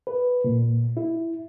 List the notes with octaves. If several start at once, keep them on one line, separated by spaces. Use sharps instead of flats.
B4
A#2
E4